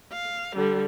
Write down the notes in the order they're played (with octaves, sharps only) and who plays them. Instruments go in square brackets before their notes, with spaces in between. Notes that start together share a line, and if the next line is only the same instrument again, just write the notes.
[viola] F5
D3 G3